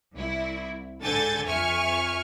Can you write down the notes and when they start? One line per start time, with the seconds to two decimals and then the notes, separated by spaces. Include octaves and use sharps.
0.13 C2 E4
1.01 G#2 D3 A4 G#5 G6 A6
1.44 F2 E5 G#5 C#6 F6